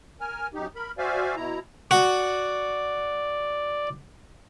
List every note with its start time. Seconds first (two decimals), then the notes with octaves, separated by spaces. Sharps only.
0.21 A#4 G#5 F6
0.54 F#2 D#4 G4
0.75 A#4 B5
0.98 F#4 C5 D5 E5 F5 G#5
1.37 B2 E4 A#5
1.91 F#4 D5